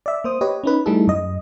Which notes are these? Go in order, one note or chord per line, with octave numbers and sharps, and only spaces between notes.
D5 E5
A#3 C5 D#6
G4 B4 C#5 D#5
C#4 D#4 B4
G3 A3 D#4 E4 G#4 A4
F#2 D#5